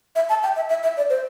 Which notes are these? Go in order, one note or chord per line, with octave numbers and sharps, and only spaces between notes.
E5
A5
G5
E5
E5
E5
D5
C5